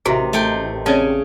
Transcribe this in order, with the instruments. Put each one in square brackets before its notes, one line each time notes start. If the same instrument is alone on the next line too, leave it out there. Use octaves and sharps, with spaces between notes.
[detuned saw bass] A1 [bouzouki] C3 D#3 [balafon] F#4 E5
[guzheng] A3 G5 C6
[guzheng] C#3 C#4 G#5 [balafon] C4 C#5 D5